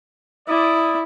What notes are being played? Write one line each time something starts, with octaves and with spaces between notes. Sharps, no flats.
E4 D5 D#6